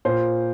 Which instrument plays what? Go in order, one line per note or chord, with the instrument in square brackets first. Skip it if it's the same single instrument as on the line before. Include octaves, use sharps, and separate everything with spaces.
[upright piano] A#2 C5